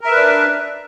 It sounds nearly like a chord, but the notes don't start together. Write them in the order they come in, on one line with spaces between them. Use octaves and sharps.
A#4 E5 B4 D4